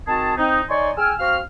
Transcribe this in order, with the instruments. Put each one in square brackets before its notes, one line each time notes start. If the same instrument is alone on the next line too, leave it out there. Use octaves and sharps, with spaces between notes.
[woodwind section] D#3 C4 F#4 G#4 A5
C4 D#4
D#4 C#5 D5 G#5 C6 C#6
G#4 G5 G#5 E6 F6
C4 F#4 F5 F6